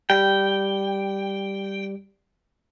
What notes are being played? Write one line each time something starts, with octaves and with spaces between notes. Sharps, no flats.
G3 G5